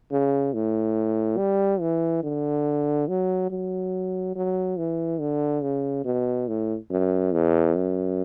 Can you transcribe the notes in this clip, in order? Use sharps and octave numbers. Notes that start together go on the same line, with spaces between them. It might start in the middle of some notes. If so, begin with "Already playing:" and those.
C#3
A2
G3
E3
D3
F#3
F#3
F#3
E3
D3
C#3
B2
A2
F#2
E2
F#2